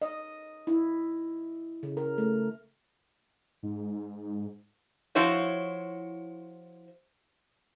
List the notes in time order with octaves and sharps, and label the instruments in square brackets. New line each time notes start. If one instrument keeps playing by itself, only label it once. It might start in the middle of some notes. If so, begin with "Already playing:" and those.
[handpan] D#5
E4
C#3
A#4
A3
[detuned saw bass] G#2
[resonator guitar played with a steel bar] F3 E4 F#4 C5 C#5